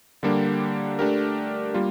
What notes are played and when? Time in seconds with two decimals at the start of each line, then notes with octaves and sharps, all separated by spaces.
0.23 D3 G3 A#3 D4 G4
0.99 A3 D4 G4 A#4
1.74 G3 A#3 F4